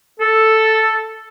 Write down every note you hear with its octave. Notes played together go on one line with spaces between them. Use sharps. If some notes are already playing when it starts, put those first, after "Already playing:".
A4